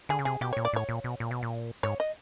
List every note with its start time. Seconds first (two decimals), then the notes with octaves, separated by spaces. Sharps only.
0.09 D3 G#4
0.19 C#3
0.25 C3 G#4
0.41 B2 G4
0.53 A#2 C#5
0.65 D5
0.73 A2 C#5
0.89 A#2
1.04 B2
1.20 A#2
1.31 B2
1.43 A#2
1.83 G#2 C#5
2.00 D#5